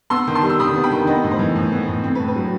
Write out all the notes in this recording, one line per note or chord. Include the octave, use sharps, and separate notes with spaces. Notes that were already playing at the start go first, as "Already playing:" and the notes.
B3 C6 E6
D#3
A5 C6
G3
E6
D#3 B5 D#6
B3
G5 B5
D#3
B3 B4 D#5
A2
C5
E3
A2
B3
A2
C4
B4
A2
B4
F#3